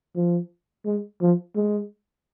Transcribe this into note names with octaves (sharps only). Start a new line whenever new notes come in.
F3
G#3
F3
G#3